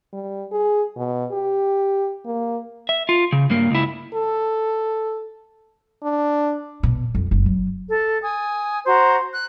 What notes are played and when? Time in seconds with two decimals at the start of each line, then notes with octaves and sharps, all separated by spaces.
0.13 G3
0.52 G#4
0.96 B2
1.32 G4
2.26 A#3
2.89 E5
3.09 F4
3.32 C#3
3.50 G2 A#3
3.71 C#2 E4
4.13 A4
6.03 D4
6.83 B2
7.15 F2
7.31 F#1
7.46 F#3
7.90 A4
8.22 G#5 D#6
8.86 F#4 C5 A#5
9.32 F#6